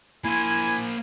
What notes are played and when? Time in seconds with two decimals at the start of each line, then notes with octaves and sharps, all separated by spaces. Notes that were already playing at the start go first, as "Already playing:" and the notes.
0.25 A#3 E4 C5 G#5